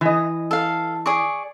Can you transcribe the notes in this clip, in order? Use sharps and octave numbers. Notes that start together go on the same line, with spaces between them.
E3 D#5
A4 F5
G#4 D5 C#6